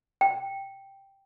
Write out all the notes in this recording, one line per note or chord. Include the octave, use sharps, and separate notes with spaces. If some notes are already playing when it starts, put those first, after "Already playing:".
G5